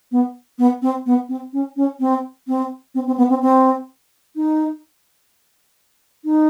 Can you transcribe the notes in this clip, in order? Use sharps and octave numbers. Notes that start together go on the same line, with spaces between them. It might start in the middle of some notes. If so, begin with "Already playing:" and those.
B3
B3
C4
B3
C4
C#4
C#4
C4
C4
C4
C4
B3
C4
C4
D#4
D#4